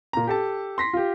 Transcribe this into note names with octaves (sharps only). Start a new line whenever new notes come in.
A#2 A#5
G4 A4 A5
C6 A#6 B6
F4 G4